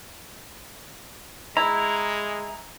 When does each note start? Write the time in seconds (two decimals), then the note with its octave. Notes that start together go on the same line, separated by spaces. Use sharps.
1.57 G#3 E4 A#5